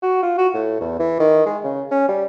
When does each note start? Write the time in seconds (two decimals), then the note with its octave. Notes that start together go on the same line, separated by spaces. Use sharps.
0.02 F#4
0.23 F4
0.38 F#4
0.54 A2
0.81 E2
0.99 E3
1.20 D#3
1.46 G#3
1.64 C#3
1.91 C#4
2.08 G3